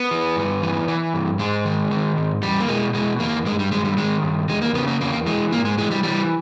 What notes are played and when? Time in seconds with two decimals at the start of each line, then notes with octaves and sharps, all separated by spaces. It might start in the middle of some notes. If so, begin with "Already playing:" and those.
Already playing: B3
0.11 E3
0.36 G2
0.62 E3
0.88 E3
1.14 G2
1.39 G#2 G#3
1.65 D#3
1.91 D#3
2.17 G#2
2.42 E2 G3
2.60 A#3
2.69 B2 G#3
2.94 B2 G#3
3.20 E2 A#3
3.45 G2 G#3
3.59 G3
3.72 D#3 G#3
3.85 G3
3.97 D#3 G#3
4.23 G2
4.49 E2 G#3
4.62 A#3
4.75 C#3 B3
4.88 A#3
5.01 E2 A#3
5.26 E3 G#3
5.52 G#2 A#3
5.65 G#3
5.78 E3 G#3
5.91 G3
6.04 E3 G3